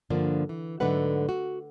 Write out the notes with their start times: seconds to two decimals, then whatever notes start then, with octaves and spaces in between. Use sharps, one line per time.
0.10 G2 D3 F3 A#3 D4
0.49 E3
0.80 G#2 D3 F#3 A3 B4 F#5
1.29 F#4